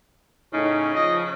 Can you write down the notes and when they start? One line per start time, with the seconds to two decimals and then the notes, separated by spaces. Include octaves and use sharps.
0.54 A2 C#3 C#4 D#4
0.95 F3 D#5